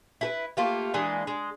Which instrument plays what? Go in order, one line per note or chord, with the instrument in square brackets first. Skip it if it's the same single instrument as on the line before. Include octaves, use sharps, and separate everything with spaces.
[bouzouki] E4 A4 B4
A3 A#3 F4 G4
E3 G#3 A#3 D4
G#3